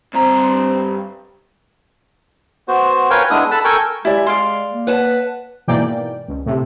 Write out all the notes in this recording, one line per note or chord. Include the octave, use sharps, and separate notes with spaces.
G2 C4 A#5
B3 F#4 C5
A#4 B4 C#5 F5 G5 G#5
G#3 B3 D4 E4 D#6
A4 A5 B5 F#6
A4 A#4 G5 G#5 C#6
G#3 E4 G4 D5 E5 G#5
G#4 D5 F5 C6
A#3
B4 C#5 F#5 A5
G#2 B2 E3 A#3 D5 G5
C#2
A2 C3